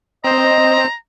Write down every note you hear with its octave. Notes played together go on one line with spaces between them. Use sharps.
C4 C5 D#5 A#5